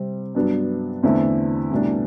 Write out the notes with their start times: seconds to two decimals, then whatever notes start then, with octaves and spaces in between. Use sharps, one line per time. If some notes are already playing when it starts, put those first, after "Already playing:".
Already playing: C3 G3 C4
0.35 G2 F#3 B3 D4
1.03 E2 D3 A3 C4 E4
1.71 C2 B2 A3 D4